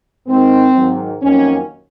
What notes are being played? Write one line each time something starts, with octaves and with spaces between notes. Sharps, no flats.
G#2 D#3 G#3 C4
G#2 D#3 F#3
F2 D#3 F#3 A#3 C#4